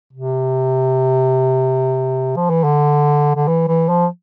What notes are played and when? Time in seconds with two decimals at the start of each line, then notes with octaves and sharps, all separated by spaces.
0.13 C3
2.36 F3
2.50 E3
2.64 D3
3.36 D3
3.48 E3
3.68 E3
3.89 F3